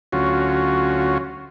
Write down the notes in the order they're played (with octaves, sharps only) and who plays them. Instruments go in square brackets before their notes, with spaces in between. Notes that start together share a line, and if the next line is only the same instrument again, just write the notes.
[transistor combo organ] D2 F#3 C#4 F4 F#4